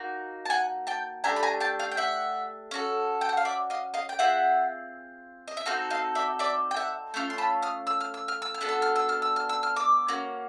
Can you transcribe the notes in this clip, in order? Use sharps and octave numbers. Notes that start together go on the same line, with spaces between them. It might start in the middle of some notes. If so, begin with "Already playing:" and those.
Already playing: A#3 D#4 F#4
A5
F#5 G#5
G5 A5
A3 D4 G4 G#5 A#5
B5
G#5 A#5
G5 A5
F5 G5
G5
E5 F#5
C#4 F#4 A4
G5
F#5
F5
D5 E5
D#5 F5
D#5 F5
G5
C4 F4 G#4 E5 F#5
D#5
E5
C4 D#4 F#4 A4 D#5 F5
D#5 F5
D5 E5
D5 E5
G5
E5 F#5
A3 C#4 F4
C6
A5 B5
D#6 F6
E6
F6
E6
F6
E6
F6
B3 D4 F#4 A4
E6
F6
E6
F6
E6
F6
E6
F6
D6 E6
A#3 C#4 F#4